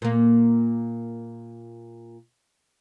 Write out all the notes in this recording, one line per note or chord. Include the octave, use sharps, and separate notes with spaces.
A#2 A#3